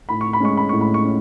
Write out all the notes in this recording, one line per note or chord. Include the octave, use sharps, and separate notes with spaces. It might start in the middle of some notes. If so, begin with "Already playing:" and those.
A2 B5
C#6
B5
G#3 C#4 C#6
B5
A2 C#6
B5
C#6
C#4